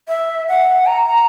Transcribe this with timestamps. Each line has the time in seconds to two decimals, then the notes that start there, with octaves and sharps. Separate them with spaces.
0.08 E5
0.48 F#5
0.86 A#5